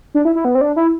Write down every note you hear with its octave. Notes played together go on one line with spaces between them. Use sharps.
D4
E4
E4
B3
C4
D4
E4